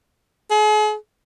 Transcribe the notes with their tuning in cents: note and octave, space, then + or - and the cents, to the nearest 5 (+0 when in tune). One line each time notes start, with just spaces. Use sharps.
G#4 +40